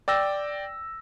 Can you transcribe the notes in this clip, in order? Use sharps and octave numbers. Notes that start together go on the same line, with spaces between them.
D5 G5 E6 A#6